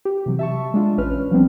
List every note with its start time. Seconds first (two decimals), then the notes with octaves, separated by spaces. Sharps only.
0.05 G4
0.26 C3 E3 F#3
0.39 E5 A5 C#6
0.74 G#3 D4 F4
0.98 A1 C#4 B4 F6
1.31 F3 G3 B3 C4 D4